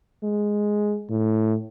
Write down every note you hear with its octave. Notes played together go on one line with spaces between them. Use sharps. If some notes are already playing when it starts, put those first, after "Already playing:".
G#3
A2